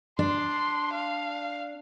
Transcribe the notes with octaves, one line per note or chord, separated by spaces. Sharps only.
D4 C6
F5